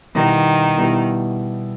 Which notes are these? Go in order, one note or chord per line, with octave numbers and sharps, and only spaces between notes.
B2 D#3 G3 B3 E4
B2 G3 B3 E4